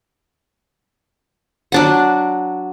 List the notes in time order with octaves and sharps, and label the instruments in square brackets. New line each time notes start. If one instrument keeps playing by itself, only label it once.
[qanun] F#3 D4 F#5